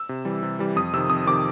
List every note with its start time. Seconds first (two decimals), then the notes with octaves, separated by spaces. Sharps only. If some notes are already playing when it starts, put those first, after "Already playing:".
Already playing: E6
0.09 C3
0.25 E3 G3
0.43 C3
0.59 E3 G3
0.76 F2 D#6
0.93 C3 D#3 E6
1.10 F2 D#6
1.26 C3 D#3 D6